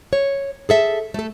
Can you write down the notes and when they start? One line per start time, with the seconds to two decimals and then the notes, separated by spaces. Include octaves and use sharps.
0.13 C#5
0.69 G#4 A4 E5
1.14 A3 A4